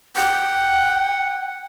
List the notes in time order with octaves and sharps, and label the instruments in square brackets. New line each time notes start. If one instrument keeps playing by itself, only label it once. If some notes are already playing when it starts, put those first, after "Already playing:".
[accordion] F#5 [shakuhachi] G5